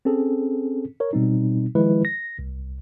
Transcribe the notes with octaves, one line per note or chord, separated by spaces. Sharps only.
C4 C#4 G#4 A4
A#4 C#5
B2 G3 C4 D#4
D#3 F3 G#3 E4 B4
A#6
C2